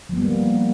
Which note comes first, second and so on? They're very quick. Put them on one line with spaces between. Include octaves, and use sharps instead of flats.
F3 B3 G3 A#3